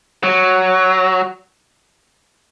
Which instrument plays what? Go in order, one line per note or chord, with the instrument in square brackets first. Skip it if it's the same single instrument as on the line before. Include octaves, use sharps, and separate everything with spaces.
[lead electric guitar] F#3